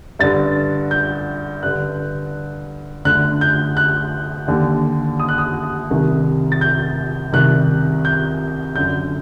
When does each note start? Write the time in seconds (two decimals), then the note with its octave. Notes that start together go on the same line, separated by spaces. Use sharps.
0.19 G2 D3 A6
0.91 G6
1.63 G2 D3 F#6
3.05 D2 D3 F#6
3.41 G6
3.77 F#6
4.48 D#2 D3
5.20 D#6
5.29 F#6
5.38 D#6
5.90 C2 C3 D#3
6.52 A6
6.61 G6
7.33 C2 C3 D#3 F#6
8.05 G6
8.76 F#2 D3 G6